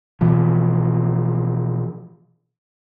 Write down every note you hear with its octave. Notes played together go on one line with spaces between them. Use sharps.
B2 E3 F3